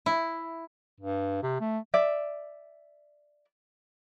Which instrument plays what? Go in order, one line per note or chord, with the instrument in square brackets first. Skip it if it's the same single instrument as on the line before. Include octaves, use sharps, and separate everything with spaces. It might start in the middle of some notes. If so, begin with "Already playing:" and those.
[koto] E4
[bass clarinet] G2
C3
A3
[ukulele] D5 E5